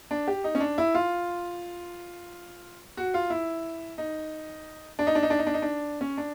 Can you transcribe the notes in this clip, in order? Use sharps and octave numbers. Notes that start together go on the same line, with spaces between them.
D4
G4
D#4
C#4
D4
E4
F4
F#4
F4
E4
D#4
D4
D#4
D4
D#4
D4
D#4
D4
D#4
D4
C#4
D4